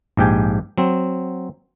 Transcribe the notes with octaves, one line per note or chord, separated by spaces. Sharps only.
A#1 G#2 G4 G5 G#5
F#3 C4